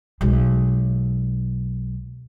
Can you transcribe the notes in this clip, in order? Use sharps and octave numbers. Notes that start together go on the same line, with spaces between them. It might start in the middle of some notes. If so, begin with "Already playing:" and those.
B1 G#3